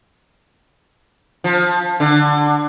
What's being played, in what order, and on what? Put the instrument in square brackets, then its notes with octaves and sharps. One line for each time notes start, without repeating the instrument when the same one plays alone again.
[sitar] F3
D3